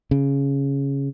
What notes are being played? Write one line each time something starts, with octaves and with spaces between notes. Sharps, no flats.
C#3